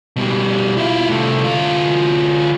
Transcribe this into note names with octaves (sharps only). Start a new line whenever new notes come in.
B2 G3
E4 F4
C2 A3
D2 F4